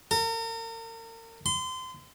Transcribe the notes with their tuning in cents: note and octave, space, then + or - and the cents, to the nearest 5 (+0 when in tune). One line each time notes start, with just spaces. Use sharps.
A#4 -40
C6 -30